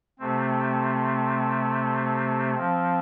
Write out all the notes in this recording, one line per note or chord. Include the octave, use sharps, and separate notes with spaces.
C3 A3 C4
F3 C4